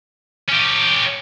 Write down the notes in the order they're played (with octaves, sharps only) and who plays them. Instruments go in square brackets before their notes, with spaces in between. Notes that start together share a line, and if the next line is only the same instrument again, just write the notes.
[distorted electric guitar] C#4 G4